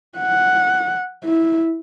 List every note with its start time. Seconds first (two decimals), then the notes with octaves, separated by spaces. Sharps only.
0.18 F#5
1.24 E4